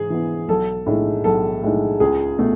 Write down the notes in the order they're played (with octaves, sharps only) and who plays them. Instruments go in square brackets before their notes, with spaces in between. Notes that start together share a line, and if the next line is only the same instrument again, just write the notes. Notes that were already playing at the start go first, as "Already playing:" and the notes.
Already playing: [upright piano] G#2 E3 [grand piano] G#4
[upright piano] E3 B3
[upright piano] B1 [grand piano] A4
[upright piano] A2 G#3 D#4
[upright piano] B1 [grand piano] A4
[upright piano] A2 G#3 D#4
[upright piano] C#2 [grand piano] G#4
[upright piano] B2 A3